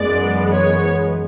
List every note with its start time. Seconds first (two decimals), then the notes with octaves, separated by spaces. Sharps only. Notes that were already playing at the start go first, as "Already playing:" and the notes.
Already playing: F#2 E3 G#3 B3 D5
0.55 C#5